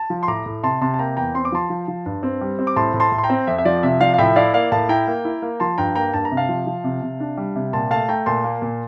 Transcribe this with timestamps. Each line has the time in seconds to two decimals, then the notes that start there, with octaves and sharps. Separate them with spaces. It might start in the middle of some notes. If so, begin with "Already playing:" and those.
Already playing: A5
0.10 F3
0.23 C6
0.28 A2 A#5 D6
0.46 A2
0.63 C3 A5 C6
0.81 C3 A5 C6
0.94 A5
0.99 A#3 G5 A#5
1.17 E2 G5 A#5
1.35 C4 C6
1.45 D6
1.52 F3 A5 C6
1.70 F3
1.88 F3
2.06 G2
2.23 C4
2.41 G3
2.59 C4
2.67 D6
2.76 A2 A5 C6
2.94 A2
3.00 A5 C6
3.12 A2
3.18 C6
3.24 G5 A#5
3.30 C4
3.47 F2 E5
3.58 E5
3.65 F3 D5
3.83 C3 E5
4.01 F3 D5 F5
4.14 F5
4.18 A2 E5 G5
4.36 E4 D5 F5
4.54 A#3 D5 F5
4.71 A2 F5 A5
4.89 E4 G5 A#5
5.07 A#3
5.25 E4
5.42 A#3
5.60 F3 A5 C6
5.78 G2 G5 A#5
5.95 A#3 G5 A#5
6.14 G2 A5
6.25 A#5
6.31 C3
6.37 F5 A5
6.49 F3
6.67 F3
6.84 C3
7.02 C3
7.20 D4
7.37 G3
7.55 C3
7.73 A#2 A5 C6
7.91 A3 F5 A5
8.08 A3 G5 A#5
8.26 A#2 A5 C6
8.44 A#3
8.62 A#2